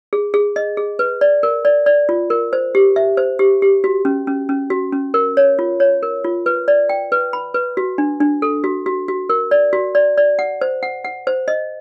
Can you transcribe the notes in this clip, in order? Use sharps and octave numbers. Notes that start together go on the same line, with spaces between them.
G#4
G#4
D#5
G#4
B4
D5
A#4
D5
D5
F4
A#4
C5
G4
E5
C5
G4
G4
F#4
C#4
C#4
C#4
F#4
C#4
A#4
C#5
F4
C#5
A#4
F4
B4
D5
G5
B4
B5
B4
F#4
D4
D4
A4
F#4
F#4
F#4
A#4
D5
F#4
D5
D5
F#5
C5
F#5
F#5
C5
D#5